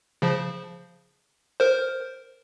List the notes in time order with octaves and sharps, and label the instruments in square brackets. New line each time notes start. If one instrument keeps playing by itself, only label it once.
[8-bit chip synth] C#3 F3
A#4 C5